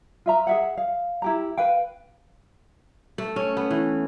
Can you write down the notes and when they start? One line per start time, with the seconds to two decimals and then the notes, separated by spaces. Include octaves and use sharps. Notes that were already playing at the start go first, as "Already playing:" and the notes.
0.26 F4 E5 A#5
0.47 G#4 E5 F#5
0.77 F5
1.22 E4 G4 A#5
1.57 B4 F5 G5
3.18 A3
3.36 C#4
3.57 B3
3.71 E3